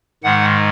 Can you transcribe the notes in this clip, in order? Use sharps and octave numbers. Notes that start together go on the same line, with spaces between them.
G#2 D#3 G#3 F#5